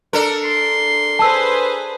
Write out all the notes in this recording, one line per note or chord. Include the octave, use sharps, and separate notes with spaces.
D4 A4 A#4
C6
G#4 B4 C5 A5 E6